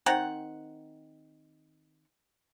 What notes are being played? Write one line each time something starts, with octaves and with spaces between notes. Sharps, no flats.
D#3 C4 F#5